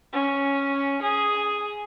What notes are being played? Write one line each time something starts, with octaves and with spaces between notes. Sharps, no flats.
C#4
G#4